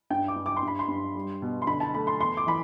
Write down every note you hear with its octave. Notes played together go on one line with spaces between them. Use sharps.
G2 G5
D6
G2
D6
C6
G2
B5
C6
G2
G3
B2
C6
D3 B5
A5
A3 B5
C6
E2 C6
D6
E3 B5